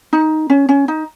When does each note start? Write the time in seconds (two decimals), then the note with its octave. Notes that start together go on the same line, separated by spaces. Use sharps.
0.13 D#4
0.50 C#4
0.69 C#4
0.88 D#4